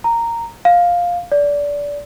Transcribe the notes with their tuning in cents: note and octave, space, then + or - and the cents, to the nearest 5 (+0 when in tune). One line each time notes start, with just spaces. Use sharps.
A#5 -10
F5 +10
D5 -20